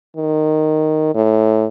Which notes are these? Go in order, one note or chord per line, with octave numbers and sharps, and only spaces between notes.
D#3
A2